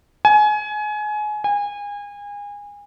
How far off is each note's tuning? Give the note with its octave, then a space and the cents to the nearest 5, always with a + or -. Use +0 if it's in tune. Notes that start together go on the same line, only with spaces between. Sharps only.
G#5 +25
G#5 -30